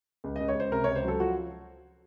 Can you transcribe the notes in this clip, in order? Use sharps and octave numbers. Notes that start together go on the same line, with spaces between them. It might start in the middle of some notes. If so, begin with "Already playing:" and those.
C#2
C#2 D#5
C#5
C#2 C5
C3 A#4
C#2 C#5
C5
F#3 A4
F3 F#4